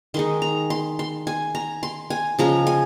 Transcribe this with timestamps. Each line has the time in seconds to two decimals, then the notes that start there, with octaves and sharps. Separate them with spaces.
0.14 D#3 G#3 D#4 C6
0.42 A#5
0.70 C6
0.99 C6
1.27 G#5
1.55 A#5
1.83 C6
2.10 G#5
2.39 C#3 F3 G#3 A#5
2.67 G#5